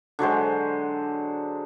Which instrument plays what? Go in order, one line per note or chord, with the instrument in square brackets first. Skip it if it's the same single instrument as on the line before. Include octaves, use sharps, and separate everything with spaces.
[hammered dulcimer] D3 F#3 G#3 C5